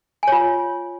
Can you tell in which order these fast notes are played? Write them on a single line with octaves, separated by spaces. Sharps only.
G#5 C#5 F4